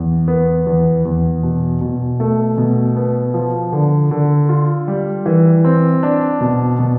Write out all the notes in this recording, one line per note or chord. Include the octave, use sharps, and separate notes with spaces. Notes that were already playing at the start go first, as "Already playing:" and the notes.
Already playing: E2
B3
E2
E2
B2
B2
A3
B2
B3
F3
D3
D3
F4
G3
E3
C4
D4
B2
B2